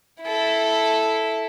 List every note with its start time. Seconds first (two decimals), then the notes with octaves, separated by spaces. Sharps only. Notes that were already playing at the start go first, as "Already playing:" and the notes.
0.23 E4 A4